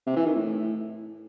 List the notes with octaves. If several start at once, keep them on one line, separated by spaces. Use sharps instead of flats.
C3
E3
D#3
A2